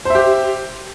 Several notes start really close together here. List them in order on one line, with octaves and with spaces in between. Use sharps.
C5 E5 G4